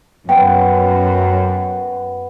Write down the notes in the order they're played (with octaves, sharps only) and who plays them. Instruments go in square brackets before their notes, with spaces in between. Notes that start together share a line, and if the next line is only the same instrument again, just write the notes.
[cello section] F#2 [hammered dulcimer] B3 [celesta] G5